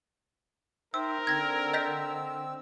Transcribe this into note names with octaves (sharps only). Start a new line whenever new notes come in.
D#4 A#4 C5 E5 G5 E6
D3 C4 E6 G#6 A#6
D#5 G6 B6